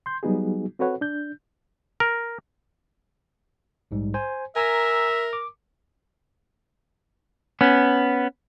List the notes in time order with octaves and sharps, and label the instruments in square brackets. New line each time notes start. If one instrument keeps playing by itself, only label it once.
[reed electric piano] C6 G6
F#3 G3 B3 D#4 F#4 G#4
C4 F#4 A4 B4 C#5 F#5
D4 G6
[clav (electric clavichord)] A#4
[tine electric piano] A#1 G#2 G3
C5 G#5
[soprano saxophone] A#4 [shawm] E5 [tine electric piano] G#5 A#5 E6
[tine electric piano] D6
[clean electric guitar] B3 C#4